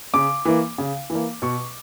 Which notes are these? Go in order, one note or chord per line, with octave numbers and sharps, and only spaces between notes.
C#3 D6
E3 A#3
C#3
E3
A#3
B2 C#6